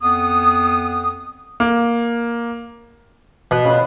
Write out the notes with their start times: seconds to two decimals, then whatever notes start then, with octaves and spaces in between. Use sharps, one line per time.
0.02 F2 B3 D#6
1.60 A#3
3.51 B2
3.65 C#3 F4 B5